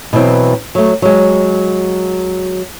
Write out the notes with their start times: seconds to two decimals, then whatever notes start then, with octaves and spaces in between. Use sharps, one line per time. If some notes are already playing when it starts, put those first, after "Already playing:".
0.13 B2 E3 F#3 C4
0.75 F#3 A3
1.02 F#3 G#3